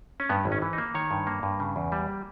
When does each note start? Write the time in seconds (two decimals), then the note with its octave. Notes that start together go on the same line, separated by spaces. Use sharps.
0.20 C#4
0.29 G2 B3
0.45 G#1
0.52 C#4
0.62 E3
0.73 D#4
0.78 A#3
0.95 D#3 C#5
1.11 G2
1.27 A#3
1.43 G2
1.60 C#3
1.76 E2
1.92 G3
2.09 A#3